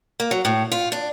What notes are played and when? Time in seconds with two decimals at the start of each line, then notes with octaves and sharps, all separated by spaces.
0.20 A#3
0.31 F#3
0.45 A2
0.72 F4
0.92 D4